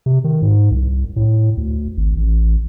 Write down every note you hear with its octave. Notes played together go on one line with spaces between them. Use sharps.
C3
D#3
G#2
C2
A2
D2
G#1
A1